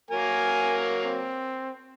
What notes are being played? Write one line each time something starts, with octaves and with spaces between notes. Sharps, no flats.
F#3 A#3 A#4 G#5
C4